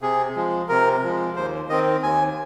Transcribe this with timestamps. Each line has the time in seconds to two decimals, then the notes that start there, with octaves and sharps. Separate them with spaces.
0.01 C3 G#4
0.36 F3 G#3
0.69 C3 A#4
1.03 F3 G#3
1.36 D#2 C5
1.69 D#3 C4 D#5
2.03 D#2 G#5